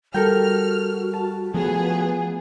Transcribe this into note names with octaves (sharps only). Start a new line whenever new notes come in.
G3 F#4 A4 A#4 G5 F6
A5
F3 A3 B3 G#4